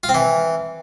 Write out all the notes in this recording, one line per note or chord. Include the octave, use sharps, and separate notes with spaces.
F4
C4
E3